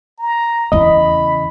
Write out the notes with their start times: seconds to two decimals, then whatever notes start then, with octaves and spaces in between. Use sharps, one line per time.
0.19 A#5
0.72 E2 C#3 D#5 B5